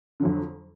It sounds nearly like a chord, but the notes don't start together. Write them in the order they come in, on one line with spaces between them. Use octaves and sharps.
D3 F#3 F2